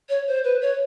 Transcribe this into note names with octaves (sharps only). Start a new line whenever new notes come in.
C#5
C5
B4
C#5